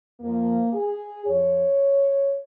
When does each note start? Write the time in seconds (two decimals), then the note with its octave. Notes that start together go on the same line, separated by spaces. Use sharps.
0.20 F2 F3 A#3
0.73 G#4
1.26 F2 F3 C#5